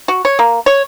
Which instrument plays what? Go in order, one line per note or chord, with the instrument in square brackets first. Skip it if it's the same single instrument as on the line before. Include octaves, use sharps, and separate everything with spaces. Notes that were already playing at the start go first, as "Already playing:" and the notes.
[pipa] F#4
C#5
A#3
C#5